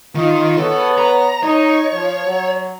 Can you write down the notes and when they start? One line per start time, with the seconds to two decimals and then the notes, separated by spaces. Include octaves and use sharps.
0.15 D#3 D#4 F4
0.58 B3 A4 B4 C#5
0.98 A#5
1.43 D#4 C#5
1.92 F3
2.26 F#3